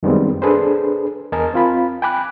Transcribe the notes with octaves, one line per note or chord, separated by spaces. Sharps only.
F#2 D#3 G3 G#3 B3 C4
D4 G#4 A4 B4 C5
E2 A#4 D#5 G#5 A5
C4 F4 B5
G5 G#5 B5 D6 F#6